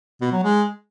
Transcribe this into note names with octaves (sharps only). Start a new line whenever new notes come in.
B2
F#3
G#3